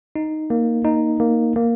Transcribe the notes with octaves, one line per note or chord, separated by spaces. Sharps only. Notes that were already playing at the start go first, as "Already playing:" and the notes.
D#4
A#3
D#4
A#3
A#3